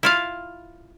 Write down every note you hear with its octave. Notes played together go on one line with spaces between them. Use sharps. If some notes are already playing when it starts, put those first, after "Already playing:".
E4 F4 F5